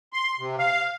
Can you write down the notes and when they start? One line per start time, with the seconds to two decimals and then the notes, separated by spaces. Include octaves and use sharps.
0.13 C6
0.39 C3
0.59 F5